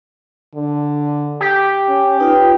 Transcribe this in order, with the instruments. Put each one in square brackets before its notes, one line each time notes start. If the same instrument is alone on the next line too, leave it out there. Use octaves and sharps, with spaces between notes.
[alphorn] D3
[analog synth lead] G4
[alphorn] C#4
[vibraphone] D#4 F4 [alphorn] B4